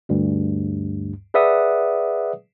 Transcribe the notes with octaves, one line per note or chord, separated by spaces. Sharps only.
D2 G2
G#4 B4 D5 E5 F#5 D#6